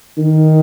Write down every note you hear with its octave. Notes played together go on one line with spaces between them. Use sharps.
D#3